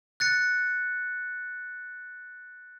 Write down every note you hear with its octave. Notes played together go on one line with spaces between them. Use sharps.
F#6 A6 C#7